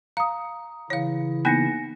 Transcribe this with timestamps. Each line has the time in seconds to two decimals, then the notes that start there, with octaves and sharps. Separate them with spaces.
0.17 F5 A#5 D#6
0.90 C#3 E3 E4 C#5 F5
1.45 A#3 B3 D#4 G#5 A#6 C#7